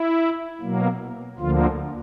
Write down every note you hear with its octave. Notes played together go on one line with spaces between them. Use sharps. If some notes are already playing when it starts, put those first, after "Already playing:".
Already playing: E4
B2 F#3 A#3
D2 D3 F3 A#3 F4